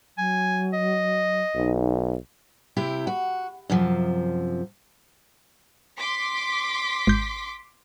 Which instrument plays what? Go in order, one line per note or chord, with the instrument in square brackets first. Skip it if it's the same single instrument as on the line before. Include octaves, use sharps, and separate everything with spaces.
[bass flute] F#3 [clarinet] G#5
[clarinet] D#5
[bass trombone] B1 [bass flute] D#4
[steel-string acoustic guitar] C3 E4 G4
F#4
F#2 C3 F3
[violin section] C6 D6 B6
[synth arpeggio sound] G#1 G6